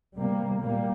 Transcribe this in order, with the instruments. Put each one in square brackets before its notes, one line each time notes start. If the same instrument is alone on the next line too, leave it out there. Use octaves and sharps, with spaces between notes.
[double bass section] C3 G3 A#3
A#2 G3 A#3